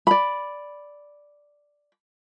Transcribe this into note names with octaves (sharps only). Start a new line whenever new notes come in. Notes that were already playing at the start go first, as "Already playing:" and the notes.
D5 B5